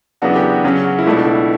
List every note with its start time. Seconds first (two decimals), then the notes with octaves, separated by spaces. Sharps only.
0.22 E2 C#3 F#3 B3 D4 F#4
0.36 G4
0.50 F#4
0.64 C#3 F#3 C#4
0.85 F#4
0.98 E4
1.06 C#2 B2 A3 D4
1.26 E4